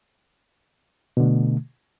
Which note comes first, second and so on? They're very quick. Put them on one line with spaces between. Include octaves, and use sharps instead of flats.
B2 D3 A3